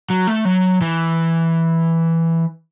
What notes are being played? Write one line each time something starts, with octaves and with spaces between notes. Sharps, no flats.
F#3
A3
F#3
E3